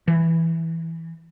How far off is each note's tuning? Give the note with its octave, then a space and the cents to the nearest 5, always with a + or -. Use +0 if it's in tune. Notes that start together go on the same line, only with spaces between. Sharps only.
E3 -5